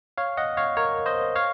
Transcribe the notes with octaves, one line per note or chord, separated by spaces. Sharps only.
C#5 F5
D#5 F#5
C#5 F5
A#4 C#5
C5 D#5
C#5 F5